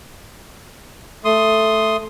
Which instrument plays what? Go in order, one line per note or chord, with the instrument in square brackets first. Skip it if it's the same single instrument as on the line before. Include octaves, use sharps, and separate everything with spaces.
[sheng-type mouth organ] A3 C6 D#6